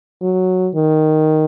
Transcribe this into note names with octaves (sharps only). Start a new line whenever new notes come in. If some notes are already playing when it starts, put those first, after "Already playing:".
F#3
D#3